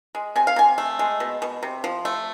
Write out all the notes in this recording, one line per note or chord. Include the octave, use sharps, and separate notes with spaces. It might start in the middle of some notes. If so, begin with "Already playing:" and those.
G#3
C3 G#5
F5
C3 G#5
A3
G#3
B2
B2
C3
F3
A3